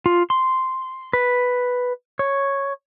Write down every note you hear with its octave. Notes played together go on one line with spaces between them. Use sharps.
F4
C6
B4
C#5